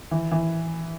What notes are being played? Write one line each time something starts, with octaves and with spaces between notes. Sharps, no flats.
E3
E3